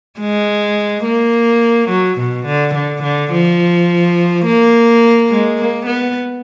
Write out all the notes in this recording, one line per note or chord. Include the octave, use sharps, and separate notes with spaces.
G#3
A#3
F#3
B2
D3
D3
D3
F3
A#3
G#3
A#3
B3